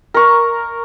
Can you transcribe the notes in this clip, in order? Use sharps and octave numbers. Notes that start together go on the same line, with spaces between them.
A#4 C#6